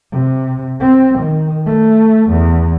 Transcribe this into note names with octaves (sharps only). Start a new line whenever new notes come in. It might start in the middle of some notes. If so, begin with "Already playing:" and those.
C3
C4
D#3
A3
E2